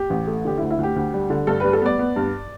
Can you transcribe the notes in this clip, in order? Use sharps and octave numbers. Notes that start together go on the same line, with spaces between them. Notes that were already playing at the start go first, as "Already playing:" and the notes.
Already playing: G4
A1
A3
D3 G4
E4
D2
E4
D2 G4
D2
G3
D3
G2 A4
G3 B4
A4
B3 D5
B3
G2